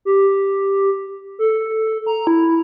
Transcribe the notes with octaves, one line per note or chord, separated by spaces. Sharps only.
G4
A4
A#5
E4